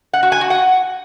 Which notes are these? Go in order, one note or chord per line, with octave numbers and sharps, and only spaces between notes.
F#5
F#4
G#5
F#4
F#5